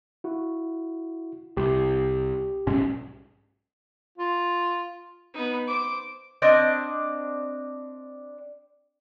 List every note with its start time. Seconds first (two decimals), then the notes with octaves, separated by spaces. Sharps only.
0.24 E4 F#4
1.57 C2 G4
2.67 B1 G#2 C#4
4.18 F4
5.34 B3 D#4
5.67 C5 D6
6.42 C4 D4 D5 D#5